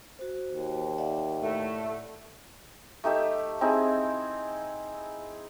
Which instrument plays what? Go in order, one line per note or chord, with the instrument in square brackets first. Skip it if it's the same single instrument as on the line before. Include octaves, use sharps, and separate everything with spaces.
[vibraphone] F#4 C5
[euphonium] D#2
[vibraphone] D5 E5 F#5
[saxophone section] A2 A3
[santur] A3 D#4 G4 E5
C4 D#4 E4 G#4